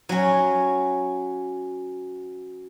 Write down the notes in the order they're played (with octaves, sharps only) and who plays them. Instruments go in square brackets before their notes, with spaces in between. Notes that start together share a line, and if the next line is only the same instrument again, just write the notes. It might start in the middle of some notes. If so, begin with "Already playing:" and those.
[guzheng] F#3 C#4